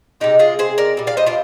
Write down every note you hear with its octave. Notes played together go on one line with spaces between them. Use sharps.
C3 D#3 G#3 D#4 G4
F4 G#4
G#4 C5
A#4 D5
A#2 G3
D5 F5
C5 D#5
D4 F4